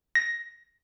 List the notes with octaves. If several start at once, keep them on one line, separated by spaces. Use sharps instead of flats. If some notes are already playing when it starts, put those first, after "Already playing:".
A#6